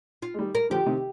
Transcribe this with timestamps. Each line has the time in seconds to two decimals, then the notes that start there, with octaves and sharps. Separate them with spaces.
0.22 F4
0.34 G#3
0.38 D#3 G3
0.55 A#4
0.70 D3 F3 G4
0.86 C3 D#3